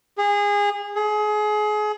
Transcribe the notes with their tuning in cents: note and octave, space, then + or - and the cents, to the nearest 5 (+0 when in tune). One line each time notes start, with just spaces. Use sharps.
G#4 -25
G#4 +30